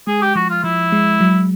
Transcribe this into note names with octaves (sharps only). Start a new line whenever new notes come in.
G#3 G#4
G4
F3 F#4
F4
F3 E4
G#3
F#3